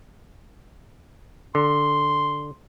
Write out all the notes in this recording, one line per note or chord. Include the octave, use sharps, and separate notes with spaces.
D3 C6